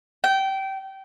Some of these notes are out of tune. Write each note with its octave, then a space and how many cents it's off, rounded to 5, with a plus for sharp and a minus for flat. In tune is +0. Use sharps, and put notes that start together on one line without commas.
G5 -20